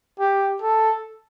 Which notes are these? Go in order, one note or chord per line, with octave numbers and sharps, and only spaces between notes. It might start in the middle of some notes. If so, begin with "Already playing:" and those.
G4
A4